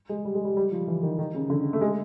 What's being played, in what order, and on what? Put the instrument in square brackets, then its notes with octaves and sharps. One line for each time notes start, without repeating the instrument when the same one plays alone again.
[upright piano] G#3
G3
G#3
G3
G3
F3
E3
D#3
D#3
C#3
D3
A3
G#3